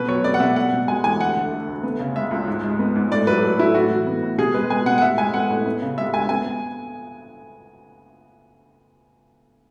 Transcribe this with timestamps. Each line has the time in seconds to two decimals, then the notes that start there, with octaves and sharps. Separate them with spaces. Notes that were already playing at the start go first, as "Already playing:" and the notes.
Already playing: B2 B4
0.08 F#3 C#5
0.24 B3 D5
0.34 F#5
0.40 B2 E5
0.56 B3 F#5
0.73 B2
0.88 G#3 G#5
1.04 E2 G#5
1.20 D2 F#5
1.37 D3
1.51 A3
1.68 D2
1.84 B3
2.00 C#3
2.16 G#3 E5
2.31 C#2
2.48 G#2
2.63 G#3
2.79 B3
2.96 G#2
3.11 A2 D5
3.27 F#3 B4
3.43 A3
3.59 A2 E4
3.74 A2 F#4
3.90 E3
4.07 B3
4.23 A2
4.38 B2 G#4
4.54 G#3 B4
4.70 B3 G#5
4.86 B2 F#5
4.98 F#5
5.02 A2 E5
5.18 G#3 G#5
5.34 B3 F#5
5.50 A2
5.66 B3
5.82 C#3
5.98 G#3 E5
6.13 D2 G#5
6.29 B3 G#5